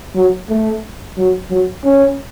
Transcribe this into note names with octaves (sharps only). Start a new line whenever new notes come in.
F#3
A3
F#3
F#3
C#4